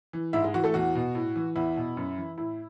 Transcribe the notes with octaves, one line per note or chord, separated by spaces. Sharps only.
E3
G#2 E4 E5
G#3 G#4
E3 F#4
A3 A4
E2 F#4
B2
A2
E3
E2 E4
B2
F#2
E3
A2 E4